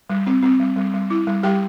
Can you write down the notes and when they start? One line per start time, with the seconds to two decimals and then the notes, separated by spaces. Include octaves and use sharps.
0.10 G3
0.27 C4
0.43 C4
0.60 G3
0.76 G3
0.94 G3
1.10 E4
1.27 G3
1.43 G3 G4 G5